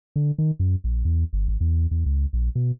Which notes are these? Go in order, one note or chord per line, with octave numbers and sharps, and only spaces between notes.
D3
D#3
F#2
A#1
E2
G1
G#1
E2
E2
C#2
A#1
B2